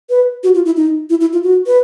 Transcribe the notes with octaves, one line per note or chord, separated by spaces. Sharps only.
B4
F#4
F4
E4
D#4
E4
E4
F4
F#4
B4